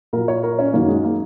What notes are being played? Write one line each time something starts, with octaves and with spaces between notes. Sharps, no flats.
A#2 F#3 A#4
C#5
A#4
C#4
F#2 D#3 F#3 A#3
G#3
A#3